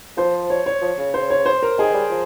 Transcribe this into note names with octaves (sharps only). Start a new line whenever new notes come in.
F3 C5
C#5
C#5
F3
C#3
C5
C#5
C5
A#4
D#3 G#4
G3
F3